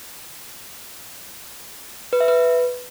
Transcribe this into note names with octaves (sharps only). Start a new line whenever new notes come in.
B4
E5
B4